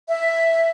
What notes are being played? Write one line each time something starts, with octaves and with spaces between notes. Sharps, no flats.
E5